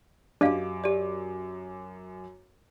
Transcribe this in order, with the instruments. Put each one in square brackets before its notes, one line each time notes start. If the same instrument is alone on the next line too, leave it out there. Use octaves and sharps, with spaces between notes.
[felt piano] F#2 D6 [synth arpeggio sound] D4 [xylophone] G4 D#5 F5
[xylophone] G4 D5